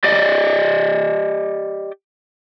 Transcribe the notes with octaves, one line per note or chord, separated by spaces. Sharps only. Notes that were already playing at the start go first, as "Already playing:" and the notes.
G4 D5 D#5